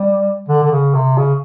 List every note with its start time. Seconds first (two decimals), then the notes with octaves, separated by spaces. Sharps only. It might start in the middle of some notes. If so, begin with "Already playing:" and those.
Already playing: G3
0.49 D3
0.64 D3
0.71 C#3
0.94 C3
1.18 C#3